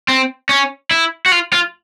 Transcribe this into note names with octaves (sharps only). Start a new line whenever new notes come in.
C4
C#4
E4
F#4
F4
F4